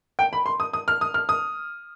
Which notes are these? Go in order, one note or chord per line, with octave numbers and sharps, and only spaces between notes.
G5
B5
C6
D#6
D#6
F6
D#6
F6
D#6